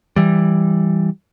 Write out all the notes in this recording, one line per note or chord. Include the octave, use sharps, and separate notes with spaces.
E3 G3